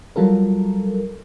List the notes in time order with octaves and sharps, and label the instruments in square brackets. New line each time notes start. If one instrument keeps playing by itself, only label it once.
[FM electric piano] F#3 G3 F4 A4 A#4